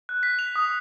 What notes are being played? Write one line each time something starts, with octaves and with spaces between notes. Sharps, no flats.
F#6
B6
F7
D#6